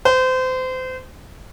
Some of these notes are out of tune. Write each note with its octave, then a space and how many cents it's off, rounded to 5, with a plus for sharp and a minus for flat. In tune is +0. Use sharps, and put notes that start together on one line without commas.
C5 -30